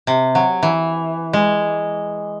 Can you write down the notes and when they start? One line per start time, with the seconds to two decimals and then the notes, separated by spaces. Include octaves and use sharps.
0.07 C3
0.35 F#3
0.63 E3
1.33 G#3